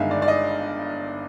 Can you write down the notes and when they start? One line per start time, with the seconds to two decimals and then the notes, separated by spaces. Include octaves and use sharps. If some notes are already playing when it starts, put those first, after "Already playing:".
Already playing: G1 G2 D#3 G#3 E5 F5
0.11 D5
0.22 D5
0.28 D#5